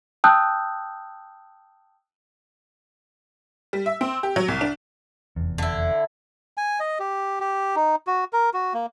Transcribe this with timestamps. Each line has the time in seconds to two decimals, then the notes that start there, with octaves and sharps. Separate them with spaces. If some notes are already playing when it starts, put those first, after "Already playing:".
0.24 G5 A5 D#6 E6 F#6 G6
3.73 G3
3.86 E5
4.01 C4
4.23 G4
4.36 F#3
4.48 C2
4.61 D4
5.36 F1 E2
5.58 D3 E4
6.57 G#5
6.80 D#5
7.00 G4
7.40 G4
7.76 D#4
8.07 F#4
8.33 A#4
8.54 F#4
8.74 A#3